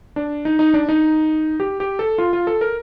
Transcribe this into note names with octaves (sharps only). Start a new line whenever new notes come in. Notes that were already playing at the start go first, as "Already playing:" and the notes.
D4
D#4
D#4
D4
D#4
G4
G4
A4
F4
F4
A4
A#4